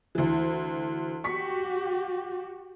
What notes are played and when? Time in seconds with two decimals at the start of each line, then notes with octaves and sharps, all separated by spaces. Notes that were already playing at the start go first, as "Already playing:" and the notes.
0.15 D2 E3
1.24 F#4 G4 C#6 B6